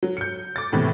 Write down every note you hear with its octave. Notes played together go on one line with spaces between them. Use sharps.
F#3
G6 C#7
D6 A6
E2 A2 C3 E3